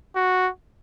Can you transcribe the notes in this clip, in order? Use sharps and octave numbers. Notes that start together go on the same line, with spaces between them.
F#4